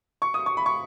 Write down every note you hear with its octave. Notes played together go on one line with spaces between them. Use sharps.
C#6
D#6
C#6
B5
C#6